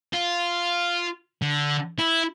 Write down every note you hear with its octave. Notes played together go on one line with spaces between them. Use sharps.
F4
D3
E4